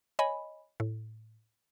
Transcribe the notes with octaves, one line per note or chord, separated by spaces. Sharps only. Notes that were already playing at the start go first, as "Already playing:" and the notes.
C#5 D#5 G#5 B5
A2